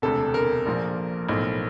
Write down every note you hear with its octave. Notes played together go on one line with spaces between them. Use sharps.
E1 D2 C3 A4
A#4
A#1 A#2 F3
B1 A2 F3